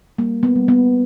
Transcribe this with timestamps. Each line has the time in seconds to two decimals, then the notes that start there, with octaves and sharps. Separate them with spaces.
0.18 G3 A#3
0.43 B3
0.56 G3
0.68 B3